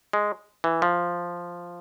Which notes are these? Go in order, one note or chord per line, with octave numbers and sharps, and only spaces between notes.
G#3
E3
F3